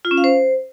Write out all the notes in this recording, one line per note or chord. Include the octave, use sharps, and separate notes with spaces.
F4
C#4
F5
C5